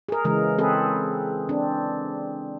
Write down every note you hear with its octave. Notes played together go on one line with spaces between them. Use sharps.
G#4 A#4
C#3 E3 G#3 A#4
C4 G#4 A4 B4
C4 D4